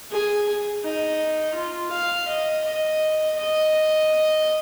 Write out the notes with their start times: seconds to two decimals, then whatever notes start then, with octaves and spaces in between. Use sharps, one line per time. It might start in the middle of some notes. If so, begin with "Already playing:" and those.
0.11 G#4
0.83 D#4
1.55 F4
1.91 F5
2.28 D#5
2.64 D#5
3.36 D#5